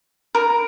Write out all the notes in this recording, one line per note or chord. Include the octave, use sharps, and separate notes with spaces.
A#4